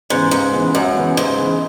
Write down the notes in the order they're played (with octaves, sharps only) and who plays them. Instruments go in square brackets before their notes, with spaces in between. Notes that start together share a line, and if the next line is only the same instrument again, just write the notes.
[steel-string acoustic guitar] G#2 [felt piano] C#3 E3 B3
[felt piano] C#2 [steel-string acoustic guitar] G#2
[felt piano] C#3 E3 B3
[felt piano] C#2 [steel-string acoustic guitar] F#2
[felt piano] C#3 E3 B3
[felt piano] C#2 [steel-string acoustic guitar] G#2
[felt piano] C#3 E3 B3